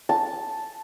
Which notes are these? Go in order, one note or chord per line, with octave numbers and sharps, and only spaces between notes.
A5